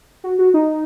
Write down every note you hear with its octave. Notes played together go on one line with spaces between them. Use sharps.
F#4
F#4
D#4